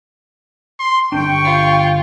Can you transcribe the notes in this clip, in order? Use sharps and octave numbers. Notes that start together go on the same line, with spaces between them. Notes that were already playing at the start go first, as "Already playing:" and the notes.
C6
G1 D4 G5 C#6
F4